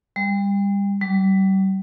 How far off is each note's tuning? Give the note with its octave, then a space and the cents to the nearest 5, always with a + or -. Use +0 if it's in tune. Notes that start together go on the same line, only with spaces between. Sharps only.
G3 +30
G3 -35